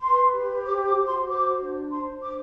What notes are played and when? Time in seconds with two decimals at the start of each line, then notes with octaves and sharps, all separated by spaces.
0.01 B4 C6
0.33 G4
0.64 C5 D6
0.86 D6
0.96 F#4
1.07 C6
1.27 C5 D6
1.59 D4
1.91 C5 C6
2.22 D4 D6